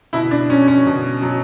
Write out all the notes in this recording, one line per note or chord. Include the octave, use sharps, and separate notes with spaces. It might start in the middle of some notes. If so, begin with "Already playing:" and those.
B2 E4
D4
F#3 C#4
C#4
B2
F#3